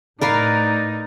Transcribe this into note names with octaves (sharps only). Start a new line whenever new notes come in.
A2 D#4 A#4 B4 D5 F5